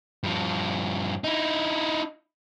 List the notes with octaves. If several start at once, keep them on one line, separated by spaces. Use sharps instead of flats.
G2 F3
D#4 E4